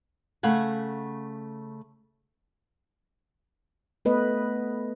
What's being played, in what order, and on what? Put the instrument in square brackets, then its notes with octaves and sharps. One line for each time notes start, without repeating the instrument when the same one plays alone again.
[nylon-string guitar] C#3 A3 F5 F#5 G#5
[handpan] A3 B3 B4 D#5